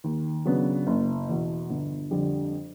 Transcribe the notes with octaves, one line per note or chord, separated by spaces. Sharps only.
D#2
C#3 F#3 B3 D4
F#1
E2 B2
G1
F2 D3 G3